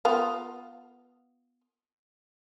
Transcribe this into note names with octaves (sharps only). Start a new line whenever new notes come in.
B3 F4 F5